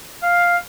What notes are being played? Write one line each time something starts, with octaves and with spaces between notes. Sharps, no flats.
F5